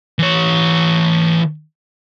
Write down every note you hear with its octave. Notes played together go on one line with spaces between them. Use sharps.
E3 C#5